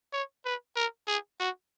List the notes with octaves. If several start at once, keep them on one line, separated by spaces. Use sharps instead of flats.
C#5
B4
A#4
G#4
F#4